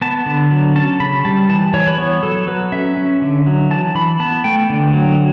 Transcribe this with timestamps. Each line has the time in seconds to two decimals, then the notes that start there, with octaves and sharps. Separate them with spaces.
0.02 B3 A5
0.26 D3
0.51 F#3
0.76 C#4 A5
1.00 C#3 B5
1.25 G3 A5
1.49 E3 A5
1.74 E3 C#5
1.87 B4
1.98 B3 C#5
2.23 F#3 A4
2.47 F#3 B4
2.72 C#4 E5
2.97 C#4
3.22 D3
3.46 F#3
3.71 E3 A5
3.95 E3 B5
4.20 B3 A5
4.44 A3 G5
4.70 D3
4.93 F#3